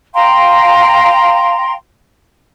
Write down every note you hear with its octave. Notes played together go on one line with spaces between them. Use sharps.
F5 G5 A#5 C6